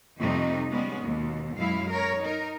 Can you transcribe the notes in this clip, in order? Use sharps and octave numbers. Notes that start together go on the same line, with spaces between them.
F2 C3 G3 A3 D#4
G3 G#3 B3 C#4
D#2 B2
F#2 G#3 E4 F5
A#4 C#5
D#4 A#4